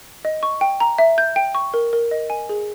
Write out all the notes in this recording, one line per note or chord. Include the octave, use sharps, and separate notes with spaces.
D#5
C#6
G5
A#5
E5
G6
G5
C#6
A#4
A#4
D#5
G#5
G#4